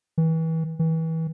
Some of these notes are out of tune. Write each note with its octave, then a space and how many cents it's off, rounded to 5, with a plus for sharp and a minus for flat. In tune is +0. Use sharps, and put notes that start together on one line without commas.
E3 -30
E3 -30